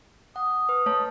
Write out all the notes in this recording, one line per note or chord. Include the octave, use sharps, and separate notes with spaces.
F#5 D#6
B4
A3 C#5 A5